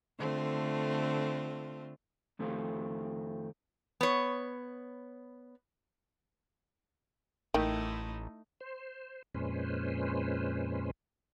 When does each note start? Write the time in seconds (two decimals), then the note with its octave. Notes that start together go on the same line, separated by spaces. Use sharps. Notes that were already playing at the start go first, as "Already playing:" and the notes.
0.18 D3 A3 C4 F4
2.39 F2 D#3 A3 C4 F4
4.01 B3 C#5
7.54 A1 D#3 A3 D#4 E4
8.61 C5
9.34 F2 A#2 G#3 C#4 B4 C5